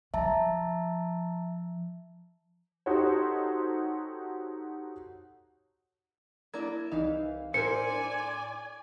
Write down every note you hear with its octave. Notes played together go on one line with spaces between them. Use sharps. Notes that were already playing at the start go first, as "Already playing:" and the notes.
F3 E5 A5 A#5
D#4 F#4 G4 A4 C5 C#5
A#3 D4 E4 G#6
C2 E3 D#4 F5
A2 E4 A#4 C5 D5 G#5 C6 C#7
D4